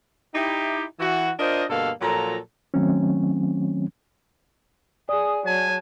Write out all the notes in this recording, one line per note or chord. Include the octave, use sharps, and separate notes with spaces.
D#4 E4 G4
E3 F#4
D4 F4 A#4 C5 D#5
G2 B2 D3 A#3 A4 F5
A#2 F3 F#3 A4 A#5
D#3 F#3 A3 C4 C#4
G#4 D5 D#6
F#3 G#5 A5